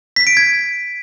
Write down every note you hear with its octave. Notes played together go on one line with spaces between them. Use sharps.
B6
D7
G#6